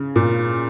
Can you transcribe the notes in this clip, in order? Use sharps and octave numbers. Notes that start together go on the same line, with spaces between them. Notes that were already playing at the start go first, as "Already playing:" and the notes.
Already playing: C#3
A#2